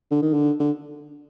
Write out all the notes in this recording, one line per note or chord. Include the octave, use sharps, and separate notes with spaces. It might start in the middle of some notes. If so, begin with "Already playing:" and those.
D3
D#3
D3
D3